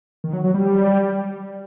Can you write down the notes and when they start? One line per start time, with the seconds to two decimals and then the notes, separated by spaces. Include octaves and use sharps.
0.24 D#3
0.33 F#3
0.44 F#3
0.54 G3